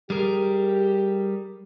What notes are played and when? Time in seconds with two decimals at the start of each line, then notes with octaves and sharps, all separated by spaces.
0.10 G3 G4 G#4 A#4